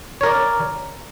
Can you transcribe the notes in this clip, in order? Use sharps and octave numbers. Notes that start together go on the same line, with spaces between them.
A#4 C#5 D5